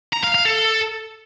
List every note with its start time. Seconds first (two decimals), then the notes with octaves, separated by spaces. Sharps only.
0.13 A#5
0.24 F5
0.35 F5
0.45 A4